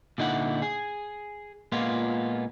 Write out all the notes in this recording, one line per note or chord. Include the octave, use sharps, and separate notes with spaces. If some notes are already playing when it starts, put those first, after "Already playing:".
A#2 D3 D#4 E4 F#5
G#4
A#2 G#3 A#3 B3 F4